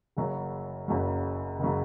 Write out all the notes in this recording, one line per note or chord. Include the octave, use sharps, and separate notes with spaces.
F#1 F#2 C#3 F#3
F#1 F#2 C#3 F#3
F#1 C#3 F#3